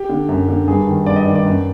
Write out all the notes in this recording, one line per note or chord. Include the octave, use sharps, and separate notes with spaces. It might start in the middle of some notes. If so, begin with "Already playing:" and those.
Already playing: G4
D3
F#2
D3
G2 G#4
D#3
G2 D5
D#5
D#3 D5
D5
F#2